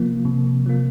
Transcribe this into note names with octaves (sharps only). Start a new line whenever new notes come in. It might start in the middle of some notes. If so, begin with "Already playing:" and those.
Already playing: C3 F3 A#3
C3
F3 A#3